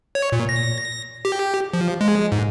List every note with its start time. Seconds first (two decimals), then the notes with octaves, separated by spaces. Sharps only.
0.15 C#5
0.32 A#2
0.49 A#6
1.25 G4
1.73 F3
2.01 G#3
2.32 G#2